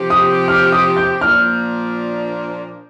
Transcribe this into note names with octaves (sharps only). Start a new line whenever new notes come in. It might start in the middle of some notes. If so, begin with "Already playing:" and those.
Already playing: C3 F3 C4 G4
D#6
F6
D#6
G6
A#2 F3 A#3 D4 F6